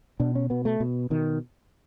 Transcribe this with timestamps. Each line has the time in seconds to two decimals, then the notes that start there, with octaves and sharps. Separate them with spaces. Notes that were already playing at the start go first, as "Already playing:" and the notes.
0.20 B2 D4
0.35 C#4
0.50 B2 B3
0.65 A3
0.80 B2
1.10 B2 D#3